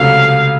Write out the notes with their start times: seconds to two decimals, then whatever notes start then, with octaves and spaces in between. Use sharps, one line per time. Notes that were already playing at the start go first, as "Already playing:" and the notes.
Already playing: C#2 C3 F#3 A3 F5